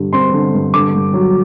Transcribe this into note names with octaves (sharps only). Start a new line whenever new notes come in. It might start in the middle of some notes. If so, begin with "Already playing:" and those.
Already playing: G2 D3 G3
C4 C6
D3
G2
D3 D6
G2
F#3